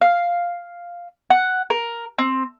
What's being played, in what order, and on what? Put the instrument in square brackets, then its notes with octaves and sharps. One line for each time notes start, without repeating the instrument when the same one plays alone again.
[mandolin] F5
F#5
A#4
C4